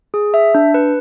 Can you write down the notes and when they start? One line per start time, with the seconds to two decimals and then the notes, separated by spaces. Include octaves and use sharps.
0.14 G#4
0.34 E5
0.55 D4
0.74 B4